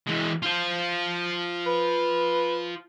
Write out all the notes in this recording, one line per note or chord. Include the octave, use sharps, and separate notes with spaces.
E3 G#3
F4 C5
B4